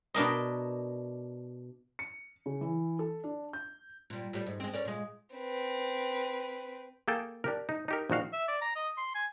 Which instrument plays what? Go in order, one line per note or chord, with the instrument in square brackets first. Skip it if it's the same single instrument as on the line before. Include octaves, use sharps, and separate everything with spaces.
[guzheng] B2 D4 A#4 D#5
[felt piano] C#7
C#3
E3
A4
D4
G6
[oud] A#2 G3
A2 G3
G#2
G#3 C4
C#4 A#4 D5
A#2 G#3
[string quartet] C4 B4
[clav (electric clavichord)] A#3 G#4 A4 G5 A5
D4 G4 A#4
D#4
D#4 G4 A#4
A#1 D#3 F#4 F5
[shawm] E5
D5
A#5
D#5
C6
G#5